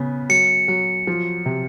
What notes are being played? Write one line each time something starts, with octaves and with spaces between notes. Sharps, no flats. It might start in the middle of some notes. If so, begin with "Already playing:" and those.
Already playing: C#3 B3
F#3 C#7
F#3
F3
C3